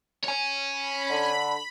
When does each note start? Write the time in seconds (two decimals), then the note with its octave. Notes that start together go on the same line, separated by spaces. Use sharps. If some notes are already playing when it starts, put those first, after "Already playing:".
0.24 C#5 G#5
0.72 B5
1.09 D3